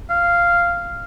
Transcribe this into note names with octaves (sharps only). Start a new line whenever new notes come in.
F5